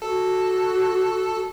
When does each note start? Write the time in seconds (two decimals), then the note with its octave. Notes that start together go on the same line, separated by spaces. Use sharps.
0.02 F#4 A4